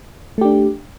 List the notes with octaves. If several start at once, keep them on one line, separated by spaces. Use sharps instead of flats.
A3 D4 G4